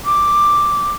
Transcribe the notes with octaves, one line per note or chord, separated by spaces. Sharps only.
D6